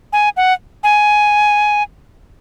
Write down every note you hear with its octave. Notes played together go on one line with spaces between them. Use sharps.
G#5
F#5
G#5